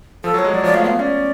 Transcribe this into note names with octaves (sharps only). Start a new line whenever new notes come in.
F3 A4
F#3
C#5
G#3
F#3 D5
F3 D5
A3 F5
B3 F5
C#4 D5